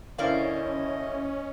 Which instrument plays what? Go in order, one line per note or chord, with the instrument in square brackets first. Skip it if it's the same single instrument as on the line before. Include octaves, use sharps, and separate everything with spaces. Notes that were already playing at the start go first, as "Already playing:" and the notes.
[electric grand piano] D3 E4 C5 [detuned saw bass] C#4 [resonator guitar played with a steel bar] A#4 D5 F5 [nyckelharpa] D#5